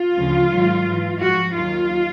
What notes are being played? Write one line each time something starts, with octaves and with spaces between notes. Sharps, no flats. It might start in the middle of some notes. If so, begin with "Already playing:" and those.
Already playing: F4
D2 C#3 F3
G#2 D#3 F#3
G#2 E3
G#2 F3 F#4
D#2 D#3 F#3 F4